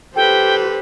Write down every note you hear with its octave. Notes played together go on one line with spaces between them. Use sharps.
G4 A4 B4 C5 G5